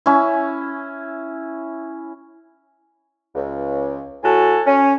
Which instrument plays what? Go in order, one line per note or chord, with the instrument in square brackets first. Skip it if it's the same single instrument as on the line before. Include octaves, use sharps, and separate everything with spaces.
[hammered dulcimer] C#4 E4
[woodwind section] C#2
A2 F#4 A4 G#5
C#4